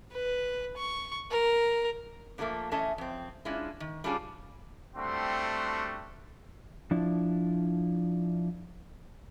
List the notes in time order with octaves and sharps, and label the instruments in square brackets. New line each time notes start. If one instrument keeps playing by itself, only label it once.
[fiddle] B4
C#6
A#4
[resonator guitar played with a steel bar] A#2 D3 F3 A3 A#3
E3 A3 C#4 D#5 A5
F2 C4
G#3 C#4 D4 E4 F4
D#3
G3 A3 C#4 D4 F4 G#4
[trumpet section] G3 A3 C4 D4 F#4 C6
[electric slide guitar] F3 D4 E4